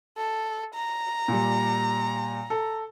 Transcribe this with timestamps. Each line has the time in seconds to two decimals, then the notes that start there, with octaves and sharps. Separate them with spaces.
0.17 A4
0.74 A#5
1.28 A#2 G3
2.50 A4